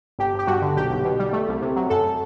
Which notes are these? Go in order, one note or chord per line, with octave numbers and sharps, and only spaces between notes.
G1 G4
G1
G4
G2 F#4
D3
B1 G4
B1
B2
G3
A3
C2
C3
F#3
F#2 A4